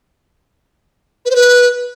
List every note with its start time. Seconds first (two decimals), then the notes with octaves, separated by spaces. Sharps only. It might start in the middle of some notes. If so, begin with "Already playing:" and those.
1.26 B4
1.31 C5
1.36 B4